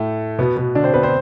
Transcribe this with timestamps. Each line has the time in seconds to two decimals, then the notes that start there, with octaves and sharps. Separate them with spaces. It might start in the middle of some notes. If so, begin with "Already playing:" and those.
Already playing: A2 A3
0.39 B2 B3
0.57 B2 B3
0.75 D3 D4
0.84 C4 C5
0.94 B3 B4
1.03 C4 C5